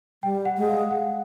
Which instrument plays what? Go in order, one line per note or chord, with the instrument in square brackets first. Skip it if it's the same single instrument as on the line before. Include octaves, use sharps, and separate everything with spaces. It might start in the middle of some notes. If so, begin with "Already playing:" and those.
[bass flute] G3 [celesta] G5
[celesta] F#5
[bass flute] G#3
[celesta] F5
F#5